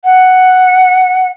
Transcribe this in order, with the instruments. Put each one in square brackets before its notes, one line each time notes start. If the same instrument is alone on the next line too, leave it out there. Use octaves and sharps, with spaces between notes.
[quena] F#5